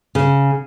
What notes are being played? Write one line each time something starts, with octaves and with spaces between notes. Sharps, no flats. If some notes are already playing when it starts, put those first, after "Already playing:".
C#3